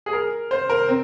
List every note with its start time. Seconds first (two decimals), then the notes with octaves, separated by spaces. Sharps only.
0.06 G#4
0.13 A#4
0.51 C5
0.69 A#4
0.89 C4